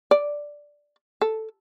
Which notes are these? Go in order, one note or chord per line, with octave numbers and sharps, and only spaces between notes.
D5
A4